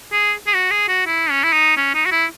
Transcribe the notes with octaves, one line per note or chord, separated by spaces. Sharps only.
G#4
G#4
F#4
G#4
F#4
E4
C#4
E4
D#4
C#4
D#4
F#4
E4